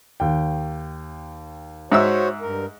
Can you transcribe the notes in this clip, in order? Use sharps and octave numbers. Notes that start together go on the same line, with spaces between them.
D#2 G5
G#2 F#4 C5 C#5 E5 E6
G2 A#4